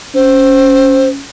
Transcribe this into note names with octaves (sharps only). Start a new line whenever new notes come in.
C#4 C5